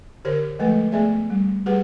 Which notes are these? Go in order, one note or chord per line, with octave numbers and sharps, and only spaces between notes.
D3 G4 A#4 C5 C#5
F3 G#3 A3 A4 B4
A3 B3 G#4 D5 E5
G3
G3 G4 G#4 B4 F#5